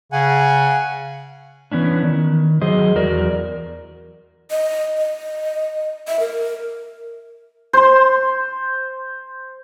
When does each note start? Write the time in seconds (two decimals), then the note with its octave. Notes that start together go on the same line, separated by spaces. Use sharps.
0.12 C#3 F#5 G#5
1.72 E3 B3 C#4 D4
2.03 D#3
2.61 F#3 G#4 C5 D#5
2.96 E2 F#4 A#4 D5
4.51 D#5
4.98 D#5
6.08 E5
6.20 A#4
7.73 C5 C6